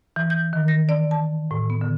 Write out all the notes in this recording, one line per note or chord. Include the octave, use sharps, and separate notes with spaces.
E3
G6
D#3
A#6
D5
A5
A2
B3
D3